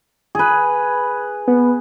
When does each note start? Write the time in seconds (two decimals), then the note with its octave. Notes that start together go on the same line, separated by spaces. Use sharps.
0.35 G#4 B4
1.48 B3